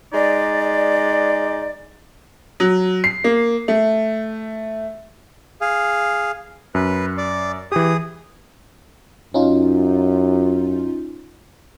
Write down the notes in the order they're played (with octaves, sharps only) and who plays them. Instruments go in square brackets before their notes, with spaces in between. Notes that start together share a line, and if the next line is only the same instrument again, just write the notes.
[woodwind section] G#3 D#4 D5
[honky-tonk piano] F#3
C7
A#3
A3
[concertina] G#4 F5
[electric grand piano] F#2 [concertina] B4
[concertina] D5
[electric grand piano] E3 G4 [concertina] G#4 D#6
[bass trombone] F#2 [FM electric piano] C#4 D#4 F4